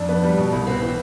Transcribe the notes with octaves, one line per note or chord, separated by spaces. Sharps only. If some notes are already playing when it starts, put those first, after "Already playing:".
Already playing: F2 D4
B3
G3
B2
C2
B3 C4
E3